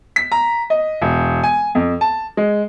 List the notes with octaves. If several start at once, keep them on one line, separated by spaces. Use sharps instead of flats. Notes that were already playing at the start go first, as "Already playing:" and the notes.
B6
A#5
D#5
E1
G#5
F2
A5
G#3